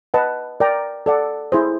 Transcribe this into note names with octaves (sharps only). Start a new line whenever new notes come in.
B4 D#5 F#5 A5
A#4 D5 G5 A#5
A4 D5 F#5
E4 G#4 C5